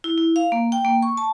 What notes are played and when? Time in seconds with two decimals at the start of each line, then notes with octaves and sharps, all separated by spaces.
0.04 E4
0.18 E4
0.36 F5
0.52 A#3
0.72 G5
0.85 A#3
1.02 C#6
1.17 A5